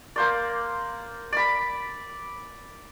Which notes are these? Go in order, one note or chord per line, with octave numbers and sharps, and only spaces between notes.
A#3 C5 D5
D5 B5